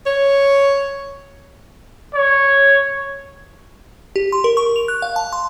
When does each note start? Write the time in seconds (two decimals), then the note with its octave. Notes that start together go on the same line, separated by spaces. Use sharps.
0.06 C#5
2.15 C#5
4.16 G4
4.32 C6
4.44 A#4
4.57 C#6
4.76 F7
4.88 F#6
5.02 F5
5.16 A5
5.33 C6